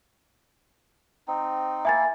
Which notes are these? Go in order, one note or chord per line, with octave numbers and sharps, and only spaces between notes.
C4 D#4
A#3 E4 E5 G#5 A6